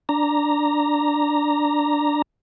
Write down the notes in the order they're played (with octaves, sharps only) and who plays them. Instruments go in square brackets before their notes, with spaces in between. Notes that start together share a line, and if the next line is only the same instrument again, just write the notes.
[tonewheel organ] D4 A#5